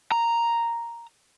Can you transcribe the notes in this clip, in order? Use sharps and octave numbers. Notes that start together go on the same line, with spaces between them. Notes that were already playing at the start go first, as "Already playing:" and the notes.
A#5